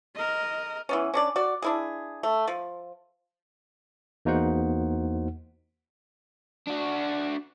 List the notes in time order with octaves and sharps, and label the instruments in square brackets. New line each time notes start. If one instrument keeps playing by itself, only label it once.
[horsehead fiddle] A#4 D#5
[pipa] E3 B3 C#4
C#4 D4 D5
F#4 D5
D4 E4 G#4
A3
F3
[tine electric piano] E2 A#3 D#4 F#4 C5 F#5
[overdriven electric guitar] D4 F#4